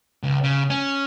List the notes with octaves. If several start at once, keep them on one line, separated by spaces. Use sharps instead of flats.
C#2
C#3
C#4